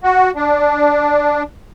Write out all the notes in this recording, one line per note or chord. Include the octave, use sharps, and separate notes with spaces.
F#4
D4